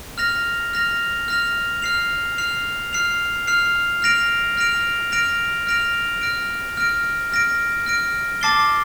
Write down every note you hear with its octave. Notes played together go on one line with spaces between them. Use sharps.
F6 A#6 F7
F6 A#6 F7
F6 A#6 F7
F6 C7 F7
F6 C7 F7
F6 C7 F7
F6 C7 F7
F6 A#6 D7 F7
F6 A#6 D7 F7
F6 A#6 D7 F7
F6 A#6 D7 F7
F6 A#6 D7
F6 A#6 D7
F6 A#6 D7
F6 A#6 D7
A5 D6 A6 C7 G7